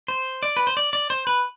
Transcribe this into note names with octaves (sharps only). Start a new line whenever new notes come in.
C5
D5
B4
C5
D5
D5
C5
B4